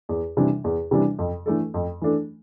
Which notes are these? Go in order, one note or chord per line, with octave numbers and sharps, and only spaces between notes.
E2
C3 E3 G3 D4
E2
C3 E3 G3 D4
F2
E3 A3 D4 A4
F2
E3 A3 D4 A4